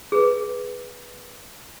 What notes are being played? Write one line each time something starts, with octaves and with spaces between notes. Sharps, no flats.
G#4 B4